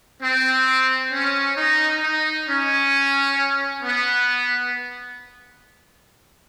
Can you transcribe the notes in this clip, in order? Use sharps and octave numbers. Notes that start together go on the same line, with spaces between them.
C4
C#4
D#4
D#4
C#4
B3